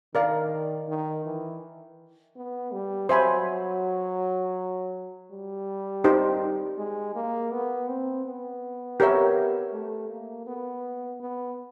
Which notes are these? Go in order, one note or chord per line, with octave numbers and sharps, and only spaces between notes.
D#3 A#4 D5 F5
D#3
E3
B3
G3
F#3 C5 E5 G#5 B5
G3
D#4 G4 C5
G#3
A#3
B3
C4
B3
G4 A#4 C#5 E5
A3
A#3
B3
B3